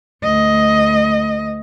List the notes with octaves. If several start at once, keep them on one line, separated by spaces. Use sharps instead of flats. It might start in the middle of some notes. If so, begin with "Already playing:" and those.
D2 D#5